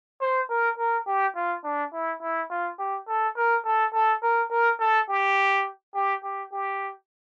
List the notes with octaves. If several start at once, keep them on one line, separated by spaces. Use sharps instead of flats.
C5
A#4
A#4
G4
F4
D4
E4
E4
F4
G4
A4
A#4
A4
A4
A#4
A#4
A4
G4
G4
G4
G4